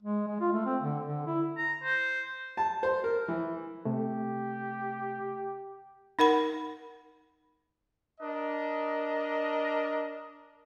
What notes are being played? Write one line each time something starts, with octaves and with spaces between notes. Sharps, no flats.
G#3
G#3
F4
A3
C4
D3
D3
E4
A#5
C5
A5
C5
A#4
E3
C3 A3 G4
D#4 A#4 F#5 B5
D4 A#4 D#5